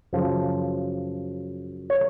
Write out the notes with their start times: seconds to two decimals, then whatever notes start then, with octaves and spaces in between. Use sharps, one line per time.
0.13 F#2 C#3 F3
1.90 C#5